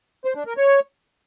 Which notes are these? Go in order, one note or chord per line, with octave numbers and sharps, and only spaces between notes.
C5
D4
A#4
C#5